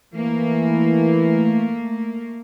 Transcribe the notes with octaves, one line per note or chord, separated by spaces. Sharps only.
E3 A3 A#3